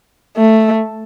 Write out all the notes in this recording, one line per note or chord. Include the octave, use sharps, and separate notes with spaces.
A3